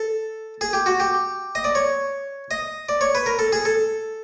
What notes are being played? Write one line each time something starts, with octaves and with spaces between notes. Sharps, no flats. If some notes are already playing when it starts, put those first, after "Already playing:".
Already playing: A4
G#4
G4
F#4
G4
D#5
D5
C#5
D#5
D5
C#5
B4
A#4
A4
G#4
A4